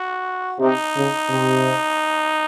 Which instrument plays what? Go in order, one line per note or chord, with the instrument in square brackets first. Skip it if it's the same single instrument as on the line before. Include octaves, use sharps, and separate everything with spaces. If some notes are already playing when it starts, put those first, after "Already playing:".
Already playing: [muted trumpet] F#4
[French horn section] C3 [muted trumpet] D#4
[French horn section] C#3
C3